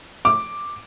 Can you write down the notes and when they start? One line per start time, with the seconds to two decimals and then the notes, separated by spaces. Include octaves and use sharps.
0.25 D6